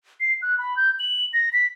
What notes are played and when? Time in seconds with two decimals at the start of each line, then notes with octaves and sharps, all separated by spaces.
0.20 C7
0.42 F#6
0.58 B5
0.77 G6
0.99 F#7
1.33 A#6
1.53 B6